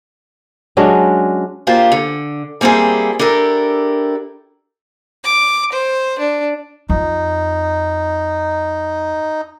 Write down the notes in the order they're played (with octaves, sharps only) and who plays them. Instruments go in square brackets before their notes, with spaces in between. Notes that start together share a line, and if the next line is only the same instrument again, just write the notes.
[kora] F#3 G#3 C#4 D4
[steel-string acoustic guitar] A#3 D4 F4 G4 C5
D3
G3 A#3 C4 E4 G#4
D4 E4 G4 A4 A#4
[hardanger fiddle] D6
C5
D4
[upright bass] F2 [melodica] D#4